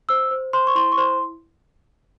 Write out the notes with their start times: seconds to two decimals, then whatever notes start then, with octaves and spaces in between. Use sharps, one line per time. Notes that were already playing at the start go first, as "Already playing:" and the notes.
0.09 C5 E6
0.31 C5
0.53 C5 C6
0.67 C#6
0.75 E4 C6
0.92 C#6
0.97 C5 C6